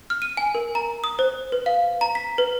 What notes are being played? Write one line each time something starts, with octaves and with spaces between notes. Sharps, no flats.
F6
D#7
G#5
A#4
A#5
D#6
C5
B4
F5
A#5
B6
B4